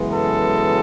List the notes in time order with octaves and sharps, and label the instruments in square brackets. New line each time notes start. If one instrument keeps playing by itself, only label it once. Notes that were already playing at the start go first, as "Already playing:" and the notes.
Already playing: [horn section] F#2 C#3 E3 G#3 B3
A4